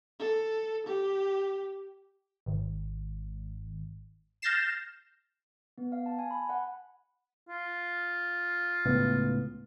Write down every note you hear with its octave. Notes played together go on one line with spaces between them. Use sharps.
A4
G4
G#1
F6 G6 A6 A#6 C7 E7
B3
F5
A5
G#5
B5
F#5
F4
C#2 A2 B3